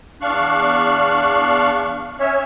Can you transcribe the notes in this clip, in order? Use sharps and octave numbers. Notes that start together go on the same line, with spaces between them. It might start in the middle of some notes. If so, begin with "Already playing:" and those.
E2 D4 F5 C#6 F#6
C#4 C#5 E5